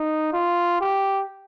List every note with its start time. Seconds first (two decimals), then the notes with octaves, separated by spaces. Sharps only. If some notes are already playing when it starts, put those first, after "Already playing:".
Already playing: D#4
0.33 F4
0.81 G4